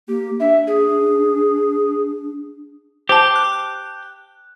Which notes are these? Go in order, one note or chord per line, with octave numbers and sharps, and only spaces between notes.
A#3 G4
D4 E5
G#4
G4 C5 A5
F#6